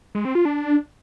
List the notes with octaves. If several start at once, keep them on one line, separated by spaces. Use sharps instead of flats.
G#3
C4
F4
D4